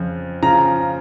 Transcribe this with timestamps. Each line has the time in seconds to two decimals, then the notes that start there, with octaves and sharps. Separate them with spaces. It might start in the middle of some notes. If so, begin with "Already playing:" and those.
Already playing: F2 C#3 F3
0.42 C#3 F3 A#5